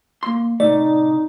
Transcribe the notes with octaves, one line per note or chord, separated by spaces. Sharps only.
A#3 C6
A2 C3 A3 D#4 D5